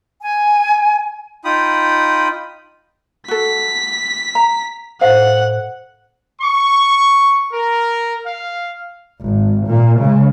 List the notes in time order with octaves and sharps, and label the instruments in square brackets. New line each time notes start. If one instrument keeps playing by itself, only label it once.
[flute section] G#5
[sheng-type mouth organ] D#4 F4 G5 B5 D#6
[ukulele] F#4 A4 [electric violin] B6
[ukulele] A#5
[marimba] A2 C5 [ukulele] F5 [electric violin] F#5
[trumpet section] C#6
A#4
F5
[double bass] G#1
A#2 A#3
C#3 G#3